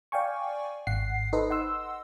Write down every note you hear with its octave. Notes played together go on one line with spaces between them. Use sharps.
D5 F5 G5 G#5 C#6
G#1 F#5 C7
D#4 A4 B4 C5 D#5
D#5 F#5 C6 E6